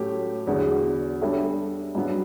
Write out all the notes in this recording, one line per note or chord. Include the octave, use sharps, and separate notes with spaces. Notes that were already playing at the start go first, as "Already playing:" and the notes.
Already playing: A2 F#3 A3 C#4 G4
E2 D3 F#3 B3
G3 D4 A4 C#5 E5
G2 F#3 B3